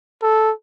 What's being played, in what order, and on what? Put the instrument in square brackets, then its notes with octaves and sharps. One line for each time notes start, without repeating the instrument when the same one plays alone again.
[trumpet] A4